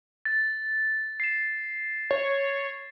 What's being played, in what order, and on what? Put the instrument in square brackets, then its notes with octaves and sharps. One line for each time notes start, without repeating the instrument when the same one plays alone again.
[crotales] A6
C7 E7
[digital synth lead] C#5